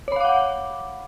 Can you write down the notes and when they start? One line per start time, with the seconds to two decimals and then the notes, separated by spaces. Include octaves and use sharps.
0.08 C#5
0.12 B5
0.16 F5
0.20 D6
0.25 F#5